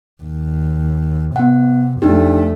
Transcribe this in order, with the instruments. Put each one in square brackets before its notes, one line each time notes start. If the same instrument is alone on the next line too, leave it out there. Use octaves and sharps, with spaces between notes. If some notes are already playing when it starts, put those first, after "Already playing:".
[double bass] D#2
[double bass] C3 [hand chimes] B3 F#5
[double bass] F2 A3 [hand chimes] D4 D#4 G4